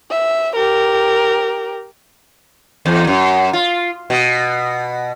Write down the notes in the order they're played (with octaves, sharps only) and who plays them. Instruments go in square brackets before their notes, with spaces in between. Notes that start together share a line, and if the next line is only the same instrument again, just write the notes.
[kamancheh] E5
G4 A#4
[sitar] E2
F#2
F4
B2